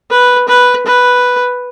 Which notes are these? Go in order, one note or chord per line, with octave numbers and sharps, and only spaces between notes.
B4
B4
B4